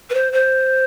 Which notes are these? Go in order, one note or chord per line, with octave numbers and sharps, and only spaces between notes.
B4
C5
C5